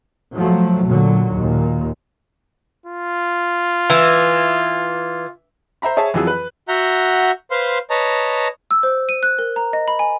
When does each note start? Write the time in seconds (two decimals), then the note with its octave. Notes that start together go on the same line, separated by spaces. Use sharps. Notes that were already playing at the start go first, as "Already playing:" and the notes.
0.35 F3 F#3 A3
0.88 A#2 D3 F#3
1.38 D#2 A#2
2.86 F4
3.90 E3
5.82 C5 E5 A#5 B5
5.97 G#4 C#5 E5 A5
6.14 F2 E3 F#3 F4 G#4 E6
6.27 B4
6.68 F#4 E5 F#5 A#5 G6
7.51 B4 C5 F5 C6
7.90 B4 C#5 D#5 A5 A#5
8.71 E6
8.83 C5
9.09 D#7
9.23 F#6
9.39 A#4
9.56 A#5
9.73 D#5
9.88 B5
9.99 G#5